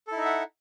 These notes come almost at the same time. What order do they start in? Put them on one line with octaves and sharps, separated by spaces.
A4 E4 D#4 E5 F#5